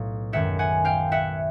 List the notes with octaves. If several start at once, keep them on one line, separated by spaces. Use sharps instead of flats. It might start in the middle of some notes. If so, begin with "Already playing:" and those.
Already playing: B1 A2 F#3 F5
F#2 D#3 G#3 E5 F#5
F#5 G#5
F5 G5
E5 F#5